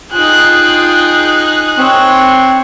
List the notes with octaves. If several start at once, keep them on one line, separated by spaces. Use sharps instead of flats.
D#4 F4 G#4 G5 F#6
C4 C5 C#5